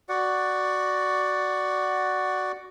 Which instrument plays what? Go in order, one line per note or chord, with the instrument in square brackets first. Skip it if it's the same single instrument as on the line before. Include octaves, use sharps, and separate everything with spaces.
[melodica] F#4 D5 F#5